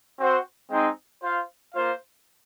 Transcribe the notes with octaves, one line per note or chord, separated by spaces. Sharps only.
C4 F#4 C5 F#5
G#3 C4 D#4
F4 C5 F5
A#3 F4 C5 F5